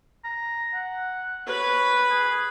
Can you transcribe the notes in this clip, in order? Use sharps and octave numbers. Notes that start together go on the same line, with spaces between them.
A#5
F#5
B4 C#5 B5
G#4